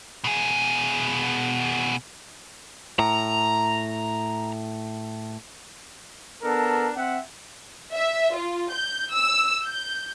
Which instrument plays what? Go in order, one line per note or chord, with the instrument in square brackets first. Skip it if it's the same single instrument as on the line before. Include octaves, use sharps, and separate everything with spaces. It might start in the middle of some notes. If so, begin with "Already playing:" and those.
[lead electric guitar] B2 G#4
[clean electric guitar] A2 [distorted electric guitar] A#5
[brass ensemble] B3 D4 A4 A#4
C4 E5 F#5
[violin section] E5
F4
G6
E6
G6